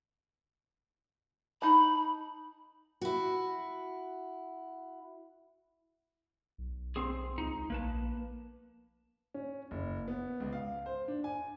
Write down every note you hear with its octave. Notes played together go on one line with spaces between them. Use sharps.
D#4 A5 B5
E4 F#4
B1
C4 G#4
C#2 D#4
A#1 A#3 B4 A5
C#4
F#1
B3
C#2
F5
C5
D4
G#5